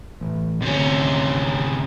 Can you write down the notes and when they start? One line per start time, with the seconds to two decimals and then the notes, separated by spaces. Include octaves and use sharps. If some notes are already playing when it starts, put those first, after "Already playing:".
0.21 A1
0.62 G#1 D2 C3 C#4